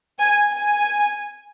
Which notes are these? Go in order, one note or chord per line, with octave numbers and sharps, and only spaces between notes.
G#5
G#5